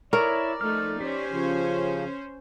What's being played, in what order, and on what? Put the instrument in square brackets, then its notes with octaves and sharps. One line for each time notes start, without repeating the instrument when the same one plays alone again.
[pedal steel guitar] E4 C#5 C#6 [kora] A#4 [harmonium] D5
[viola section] F3 A3 D#4 [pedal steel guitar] F6
[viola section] C#4 C5 [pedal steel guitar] G4
[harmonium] C#3 F3